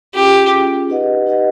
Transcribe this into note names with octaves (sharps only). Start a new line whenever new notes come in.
C#4 F4 G4 G#4
C#4 F4 G#4
D#4 G4 B4 D#5 F#5
D#4 G4 B4 D#5 F#5